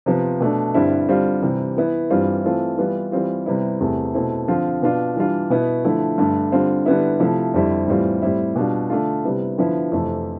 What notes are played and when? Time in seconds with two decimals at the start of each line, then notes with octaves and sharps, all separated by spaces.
0.06 C3 F3 B3
0.40 B2 A3 D4
0.74 G2 D3 G3 C4 E4
1.08 D3 G3 C4 F4
1.42 C3 E3 G3
1.76 E3 B3 E4
2.10 G2 E3 G3 C4 F4
2.44 E3 A3 C4 F4
2.78 E3 G3 B3 F4
3.12 E3 G3 C4 F4
3.46 C3 G3 B3 E4
3.80 E2 C3 E3 A3 C4
4.14 B2 A3 C4 E4
4.48 D3 F3 C4 F4
4.82 B2 B3 D4 F4
5.16 E3 G3 D4 F4
5.50 B2 B3 E4
5.84 D3 F3 A3 E4
6.18 G2 D3 A3
6.52 D3 G3 C4 F4
6.86 D3 G3 B3 E4
7.20 C3 F3 A3 E4
7.54 F2 D3 G3 C4 E4
7.88 A2 E3 G3 C4 F4
8.22 A2 G3 C4 E4
8.56 B2 G3 D4 F4
8.90 D3 A3 D4 F4
9.24 C3 G3 B3 E4
9.58 D3 F3 B3 E4
9.92 F2 C3 E3 A3